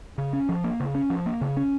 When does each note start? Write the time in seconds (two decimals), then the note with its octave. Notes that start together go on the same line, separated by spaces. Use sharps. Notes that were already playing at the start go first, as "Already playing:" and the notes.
0.18 C#3
0.33 C#4
0.49 F3
0.64 A#3
0.80 C#3
0.95 C#4
1.10 F3
1.26 A#3
1.41 C#3
1.57 C#4